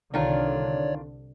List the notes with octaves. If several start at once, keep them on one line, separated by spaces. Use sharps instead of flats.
C2 D3 D#3 D4 F4 C#5 D5